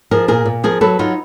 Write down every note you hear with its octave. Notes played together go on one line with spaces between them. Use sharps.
F3 G#4 A#4
A#2 G#4 A#4
A#2
F3 G#4 A#4
F#3 A4 B4
F#3 D#4 F4